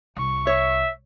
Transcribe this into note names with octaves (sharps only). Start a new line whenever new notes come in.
C2 C#6
C#5 E5